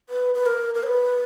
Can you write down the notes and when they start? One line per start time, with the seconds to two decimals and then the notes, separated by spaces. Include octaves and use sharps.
0.09 B4
0.34 B4
0.46 A#4
0.75 A#4
0.83 C#5
0.87 B4